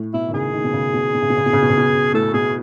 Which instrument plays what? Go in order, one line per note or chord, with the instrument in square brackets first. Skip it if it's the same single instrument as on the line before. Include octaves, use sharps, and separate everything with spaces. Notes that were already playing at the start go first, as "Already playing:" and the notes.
Already playing: [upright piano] A2
[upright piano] B2 [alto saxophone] E4
[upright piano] D#3
[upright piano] C#3 [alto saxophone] G#4
[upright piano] D#3
B2
C#3
B2
B2
C#3
B2
C#3
B2
C#3
B2
C#3
B2
[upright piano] A2 [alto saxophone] A4
[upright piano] B2 [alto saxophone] G#4